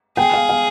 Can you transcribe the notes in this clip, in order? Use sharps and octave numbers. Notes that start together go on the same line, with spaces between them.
G#4 G5
F5
F5